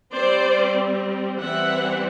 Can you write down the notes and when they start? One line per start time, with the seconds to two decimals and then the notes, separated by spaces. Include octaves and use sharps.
0.12 G3 C4 C5 D5
1.40 E3 G3 C4 E5 F#5